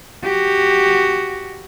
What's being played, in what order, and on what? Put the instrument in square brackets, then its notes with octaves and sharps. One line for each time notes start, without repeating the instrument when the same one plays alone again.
[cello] F#4 G4